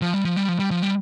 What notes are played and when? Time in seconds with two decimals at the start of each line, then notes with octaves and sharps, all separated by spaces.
0.02 F3
0.14 G3
0.25 F3
0.36 G3
0.48 F3
0.59 G3
0.71 F3
0.82 G3